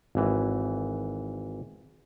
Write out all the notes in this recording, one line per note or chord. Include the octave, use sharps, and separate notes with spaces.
G#1 E3